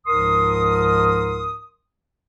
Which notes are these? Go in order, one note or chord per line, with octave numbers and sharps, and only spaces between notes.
C#2 G#2 F3 A#4 C6 D#6